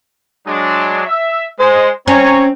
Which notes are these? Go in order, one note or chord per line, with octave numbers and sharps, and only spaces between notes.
F#3 G#3 D4
E5
G#3 C5
C4 C#4 C#5 G#5 A#5